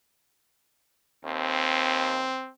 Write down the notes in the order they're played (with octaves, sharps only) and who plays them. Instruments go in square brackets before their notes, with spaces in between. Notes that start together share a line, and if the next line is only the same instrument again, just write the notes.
[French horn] D#2 [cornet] C4